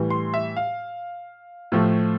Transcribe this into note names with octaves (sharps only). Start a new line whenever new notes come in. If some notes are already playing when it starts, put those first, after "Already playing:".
Already playing: A2 E3 G3
C6
E5
F5
A2 F3 A3